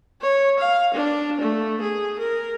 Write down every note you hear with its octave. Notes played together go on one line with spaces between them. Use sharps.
C#5
F5
D4
A3
G#4
A#4